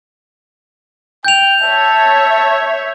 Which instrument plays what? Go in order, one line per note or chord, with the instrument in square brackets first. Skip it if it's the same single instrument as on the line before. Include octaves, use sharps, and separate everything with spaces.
[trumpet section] G5 [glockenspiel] G6 F7
[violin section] C#5 E5 [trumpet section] A5